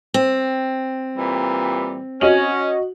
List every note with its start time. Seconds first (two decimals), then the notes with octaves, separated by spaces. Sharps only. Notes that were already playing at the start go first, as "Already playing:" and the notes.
0.14 C4
1.17 A#2 E3 G3
2.21 C#4 F#4 D#5 F#7